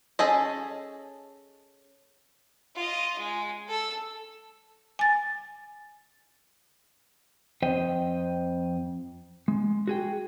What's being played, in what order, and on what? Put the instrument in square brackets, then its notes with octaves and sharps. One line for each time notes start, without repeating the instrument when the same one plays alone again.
[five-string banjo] C#4 G#4 A4 D#5
[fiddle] F4 D#5
G#3
A4 E6
[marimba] G#5 A6
[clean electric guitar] F2 C5 D#5 G5
G#3
F#4 G#4 G5